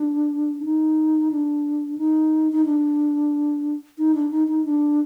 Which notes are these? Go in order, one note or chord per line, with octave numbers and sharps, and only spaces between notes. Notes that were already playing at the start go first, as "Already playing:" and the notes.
Already playing: D4
D4
D#4
D4
D#4
D#4
D4
D#4
D4
D#4
D#4
D4